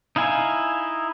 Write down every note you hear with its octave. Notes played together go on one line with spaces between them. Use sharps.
D#4 E4 F5 G#5